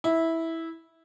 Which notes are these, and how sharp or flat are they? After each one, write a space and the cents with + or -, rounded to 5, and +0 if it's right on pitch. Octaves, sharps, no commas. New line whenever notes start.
E4 -10